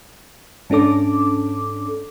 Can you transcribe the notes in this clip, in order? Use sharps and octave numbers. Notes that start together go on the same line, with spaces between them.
G#2 C#4 D4 A4 D6